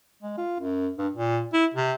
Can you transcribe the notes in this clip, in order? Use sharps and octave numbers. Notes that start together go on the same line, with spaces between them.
G#3
F4
F#2
G2
A#2
E4
C3